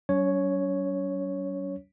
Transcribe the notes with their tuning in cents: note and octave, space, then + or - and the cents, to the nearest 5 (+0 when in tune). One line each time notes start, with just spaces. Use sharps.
F#3 +45 C#4 +35 C#5 +0